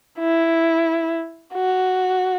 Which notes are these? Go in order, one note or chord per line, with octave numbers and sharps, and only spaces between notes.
E4
F#4